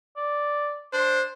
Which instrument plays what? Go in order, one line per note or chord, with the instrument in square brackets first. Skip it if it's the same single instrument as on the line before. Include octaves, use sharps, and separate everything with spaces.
[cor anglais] D5
[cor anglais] D4 [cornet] C5